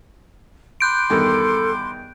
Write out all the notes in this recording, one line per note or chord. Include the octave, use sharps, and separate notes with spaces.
B5 C6 D6 F#6 G6 D7
E2 G2 D#3 A4